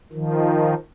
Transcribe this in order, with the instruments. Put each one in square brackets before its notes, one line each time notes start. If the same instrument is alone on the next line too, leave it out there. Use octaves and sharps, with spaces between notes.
[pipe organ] D#3 F3